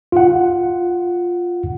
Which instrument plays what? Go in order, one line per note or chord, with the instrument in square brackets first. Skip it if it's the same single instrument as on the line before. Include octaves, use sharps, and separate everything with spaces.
[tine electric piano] F4 F#5